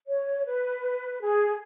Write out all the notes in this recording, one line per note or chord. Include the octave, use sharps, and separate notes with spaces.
C#5
B4
G#4